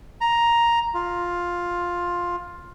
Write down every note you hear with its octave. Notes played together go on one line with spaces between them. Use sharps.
A#5
F4